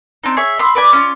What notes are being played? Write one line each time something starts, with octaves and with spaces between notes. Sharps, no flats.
C4 D4 D#4
G#4 C#5 E5
B5 C6 E6
B4 D5 G#5
C#4 F4